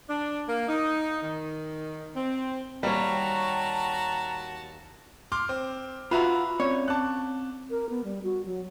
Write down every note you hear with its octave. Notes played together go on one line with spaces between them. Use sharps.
D4
A#3
D#4
D#3
C4
D#2 G3 F#4 C#5 A5 A#5
C6 D6 F6
C4
F4 F#4 B4 E5 A#5
C4 C#4 C#5 D5
C4 A5 D6 F#6
A#4
B3
G3
F#4
F#3